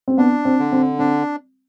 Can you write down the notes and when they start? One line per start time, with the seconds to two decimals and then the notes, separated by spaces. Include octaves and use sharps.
0.08 C4
0.18 B3 D4
0.45 C4
0.59 D3
0.72 C4
0.99 C4 D4